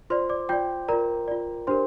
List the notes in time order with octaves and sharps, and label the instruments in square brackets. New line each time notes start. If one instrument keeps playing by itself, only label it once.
[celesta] F4 C5 D5 C6
D5 D6
F4 D5 G5 G6
F4 A#4 D5 A#5
F4 D5
D4 G4 A#4 C5 C6